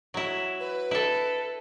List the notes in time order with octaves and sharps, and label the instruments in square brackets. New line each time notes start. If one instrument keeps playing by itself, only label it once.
[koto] F#3 E4
[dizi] B4
[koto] E4 A4